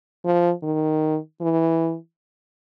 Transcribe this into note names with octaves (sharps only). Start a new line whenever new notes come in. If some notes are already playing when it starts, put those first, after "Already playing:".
F3
D#3
E3